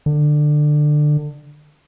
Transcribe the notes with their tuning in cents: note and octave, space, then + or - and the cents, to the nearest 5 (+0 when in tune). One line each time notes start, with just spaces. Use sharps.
D3 +20